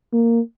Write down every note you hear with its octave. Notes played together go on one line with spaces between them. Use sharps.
A#3